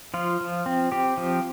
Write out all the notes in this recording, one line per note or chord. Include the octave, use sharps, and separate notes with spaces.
F3 F4
F3
C4
C4 G4
F3